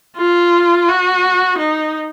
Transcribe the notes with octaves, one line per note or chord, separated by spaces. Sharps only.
F4
F#4
D#4